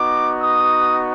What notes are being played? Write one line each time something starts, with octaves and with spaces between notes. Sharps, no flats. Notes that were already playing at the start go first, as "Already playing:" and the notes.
Already playing: B3 D#4 F#4 D6
D#6